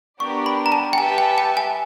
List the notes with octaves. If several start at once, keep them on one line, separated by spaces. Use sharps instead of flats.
B3 D4 G4 A#4 D5 C#6
B5
A#5
A5
G5
G4 B4 E5 G#5 A5
G5
G5
G#5